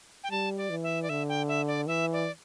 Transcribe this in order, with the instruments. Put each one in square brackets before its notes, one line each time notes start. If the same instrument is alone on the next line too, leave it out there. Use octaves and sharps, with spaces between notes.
[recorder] G5
[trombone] G3 [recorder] A5
[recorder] D5
[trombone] E3
[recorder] E5
D5
[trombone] D3 [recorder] E5
[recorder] G5
E5
D5
[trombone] E3 [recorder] E5
[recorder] D5